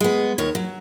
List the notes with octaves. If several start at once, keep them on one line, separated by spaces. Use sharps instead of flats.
G#3 B3
D#2 D#3 C#5
F#3